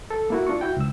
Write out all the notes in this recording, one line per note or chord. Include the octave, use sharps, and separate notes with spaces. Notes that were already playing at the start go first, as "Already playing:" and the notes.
A4
A#3 E4 F#4
D4 F4 C#6
E4 F#4 G5
C#2 E6